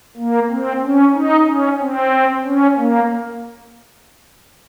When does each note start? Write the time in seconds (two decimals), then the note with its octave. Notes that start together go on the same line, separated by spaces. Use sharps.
0.17 A#3
0.50 C4
0.82 C#4
1.14 D#4
1.46 C#4
1.79 C4
2.44 C#4
2.77 A#3